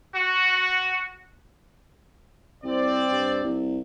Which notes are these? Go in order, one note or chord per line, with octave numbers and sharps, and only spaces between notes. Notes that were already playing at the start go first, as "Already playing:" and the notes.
F#4
C2 C4 D5
G2
C2